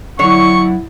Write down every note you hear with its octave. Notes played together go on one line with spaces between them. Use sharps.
D3 F#3 E4 C#5 F#5 C#6